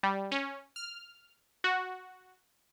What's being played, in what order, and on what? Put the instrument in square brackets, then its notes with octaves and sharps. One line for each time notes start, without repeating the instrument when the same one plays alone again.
[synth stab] G3
C#4
F6
F#4